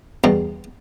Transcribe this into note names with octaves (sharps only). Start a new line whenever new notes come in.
E2 B2 G3 A#5